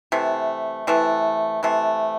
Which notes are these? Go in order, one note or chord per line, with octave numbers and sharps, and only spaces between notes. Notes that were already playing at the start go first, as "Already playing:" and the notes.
C3 E3 A3
C3 E3 A3
C3 E3 A3